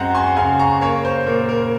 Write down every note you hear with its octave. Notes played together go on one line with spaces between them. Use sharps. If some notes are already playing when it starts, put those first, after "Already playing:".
Already playing: F#2 G#3 C4 F#5 A#5
G#5 C6
C#3 F5 G#5
A#5 C#6
A#3 C#5 F5
C5
A#2 A#4
A#4